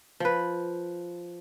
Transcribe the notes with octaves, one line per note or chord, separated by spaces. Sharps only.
F3 B4